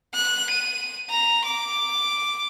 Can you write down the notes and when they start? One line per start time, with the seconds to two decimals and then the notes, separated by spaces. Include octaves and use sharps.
0.14 F#6
0.50 D#7
1.10 A#5
1.45 D6